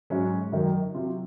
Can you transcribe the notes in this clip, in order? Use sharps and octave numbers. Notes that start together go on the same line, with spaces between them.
G#2 F#3 C#4
F#2 D#3 F#3
C3 F#3 F4